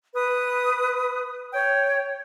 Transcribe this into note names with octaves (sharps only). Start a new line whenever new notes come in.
B4 D#6
C#5 G5